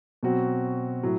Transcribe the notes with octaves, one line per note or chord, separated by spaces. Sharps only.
B2 F#3 C4 F#4
A2 F#3